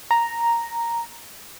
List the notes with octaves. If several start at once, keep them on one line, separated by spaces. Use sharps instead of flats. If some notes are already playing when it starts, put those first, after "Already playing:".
A#5